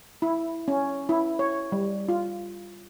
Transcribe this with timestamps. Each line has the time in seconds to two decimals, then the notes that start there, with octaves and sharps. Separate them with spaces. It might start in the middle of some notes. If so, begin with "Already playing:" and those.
0.22 E4
0.68 C#4
1.09 E4
1.39 C#5
1.72 G3
2.09 F4